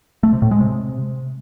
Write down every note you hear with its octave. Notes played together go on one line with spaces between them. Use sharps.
A3
C3
A2
G#3
C3